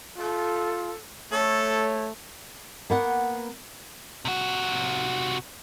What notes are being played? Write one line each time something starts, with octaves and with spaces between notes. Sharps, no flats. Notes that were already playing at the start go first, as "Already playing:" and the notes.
F4 A4
A3 A4 C#5
A#3 B3 F#5
C3 F#4